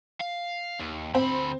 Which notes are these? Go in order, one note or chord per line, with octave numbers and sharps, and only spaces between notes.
F5
D#2
D2 C4 B5